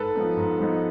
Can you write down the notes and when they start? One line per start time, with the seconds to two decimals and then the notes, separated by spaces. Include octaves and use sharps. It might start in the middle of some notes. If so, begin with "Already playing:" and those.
Already playing: G#2 A4 B4
0.15 F3 G#3 B3 D#4
0.37 G#2
0.59 F3 G#3 B3 D#4